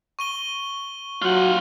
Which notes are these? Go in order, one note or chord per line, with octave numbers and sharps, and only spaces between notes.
C#6 D#7 G7
F#3 F4 F#5